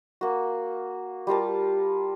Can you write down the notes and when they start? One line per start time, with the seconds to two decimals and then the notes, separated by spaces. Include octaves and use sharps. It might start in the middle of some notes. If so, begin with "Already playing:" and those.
0.21 A#3 F#4
1.27 G3 F4 A#4 A5